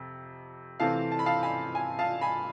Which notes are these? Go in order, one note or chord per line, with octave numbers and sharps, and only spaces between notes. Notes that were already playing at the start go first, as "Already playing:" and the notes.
Already playing: F2 C3
C3 E3 A3 C4 F5 A5
A5
B5
F5 A5
G#5 B5
G#5
F5 A5
G#5 B5